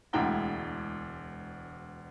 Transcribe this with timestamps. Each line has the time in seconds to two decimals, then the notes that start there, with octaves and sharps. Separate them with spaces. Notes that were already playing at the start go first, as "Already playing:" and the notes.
0.13 E1 D2 G#3 E4 G5 A#5